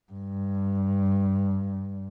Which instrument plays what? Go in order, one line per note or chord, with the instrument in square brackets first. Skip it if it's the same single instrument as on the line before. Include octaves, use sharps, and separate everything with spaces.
[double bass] G2